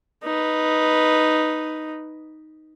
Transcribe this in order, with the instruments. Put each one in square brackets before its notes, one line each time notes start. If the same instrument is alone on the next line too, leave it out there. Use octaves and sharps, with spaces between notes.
[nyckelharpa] D#4 B4